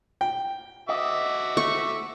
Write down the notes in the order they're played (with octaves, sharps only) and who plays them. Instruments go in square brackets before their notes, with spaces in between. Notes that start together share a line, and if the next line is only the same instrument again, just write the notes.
[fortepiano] G5
[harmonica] F#4 E5 D6 [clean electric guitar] D#5
[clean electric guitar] A3 [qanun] C#6